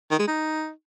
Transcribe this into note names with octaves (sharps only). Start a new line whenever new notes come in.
D#3
G#3
D#4